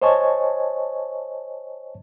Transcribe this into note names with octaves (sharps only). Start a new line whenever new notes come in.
C5 C#5 D#5 G#5 A5 C#6